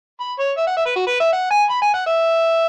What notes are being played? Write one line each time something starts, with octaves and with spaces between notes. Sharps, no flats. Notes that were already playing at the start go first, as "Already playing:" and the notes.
B5
C#5
E5
F#5
E5
B4
F#4
B4
E5
F#5
G#5
B5
G#5
F#5
E5